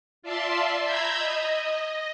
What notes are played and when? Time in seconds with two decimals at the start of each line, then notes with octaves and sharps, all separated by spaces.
0.22 F4 D5 E5 A5 C6
0.84 A#5 B5 E6 G6 G#6
1.18 D#5